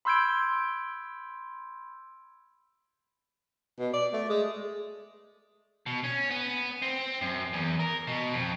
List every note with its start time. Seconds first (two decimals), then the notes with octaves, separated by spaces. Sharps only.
0.05 B5 C6 E6 G6 G#6 D7
3.79 B2
3.94 D5
4.13 A3
4.30 G#3
5.86 B2
6.04 C#4
6.31 B3
6.82 C4
7.21 F#2
7.53 E2
7.80 A#4
8.07 B2
8.33 F2